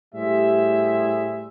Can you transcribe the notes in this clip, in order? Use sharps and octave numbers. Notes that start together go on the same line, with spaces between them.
A2 G3 G4 G#4 C5 E5